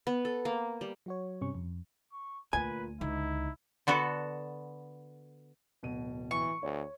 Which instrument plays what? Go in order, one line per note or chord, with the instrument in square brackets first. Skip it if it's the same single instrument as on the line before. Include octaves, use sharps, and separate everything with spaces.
[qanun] B3
A4
A#3
G3
[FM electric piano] F#3 F#4 C#5
G2 C3 C#4 C#6
F2
[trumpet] C#6
[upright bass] D2 [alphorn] A#2 [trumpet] B4 [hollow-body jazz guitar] G#5
[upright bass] C#2 D3 [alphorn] D#4 [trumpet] E4
[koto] D3 B3 F#4 A4
[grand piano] D1 B2 D#7
[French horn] E3 [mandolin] C#6
[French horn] D2 [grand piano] C#5